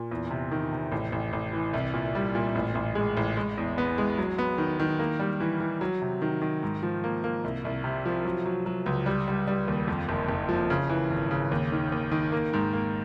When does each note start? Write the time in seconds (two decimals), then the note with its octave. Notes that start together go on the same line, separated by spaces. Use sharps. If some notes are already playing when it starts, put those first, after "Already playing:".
Already playing: A#2
0.11 E2
0.31 C3
0.51 D#3
0.72 C3
0.92 A1
1.12 A1
1.33 A1
1.53 E3
1.73 C2
1.93 A#2
2.15 G3
2.35 A#2
2.55 A1
2.75 A1
2.95 G#3
3.17 A1
3.37 G#3
3.58 E2
3.78 B3
3.98 G#3
4.18 F#3
4.38 B3
4.58 D#3
4.79 D#3
4.99 A#3
5.20 G3
5.40 E3
5.60 E3
5.81 F#3
6.02 C3
6.22 D#3
6.42 D#3
6.63 G#2
6.83 F3
7.04 A#3
7.24 A#3
7.44 C2
7.65 C2
7.84 C3
8.05 F3
8.25 F#3
8.46 F#3
8.66 F#3
8.86 C#2
9.06 G3
9.28 G3
9.47 G3
9.68 D#2
9.88 F2
10.09 F#1
10.29 F#1
10.49 F3
10.70 C#3
10.89 E3
11.10 G#1
11.31 C#3
11.51 D#2
11.72 D#3
11.92 D#2
12.11 D#3
12.32 A#3
12.53 G#2
12.73 A#3